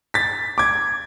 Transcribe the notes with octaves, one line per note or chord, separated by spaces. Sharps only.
A6 B6
D6 G#6